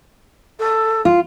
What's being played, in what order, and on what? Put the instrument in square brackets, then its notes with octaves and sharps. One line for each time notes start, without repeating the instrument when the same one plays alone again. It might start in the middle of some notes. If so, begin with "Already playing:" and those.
[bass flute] A4
[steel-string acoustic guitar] F4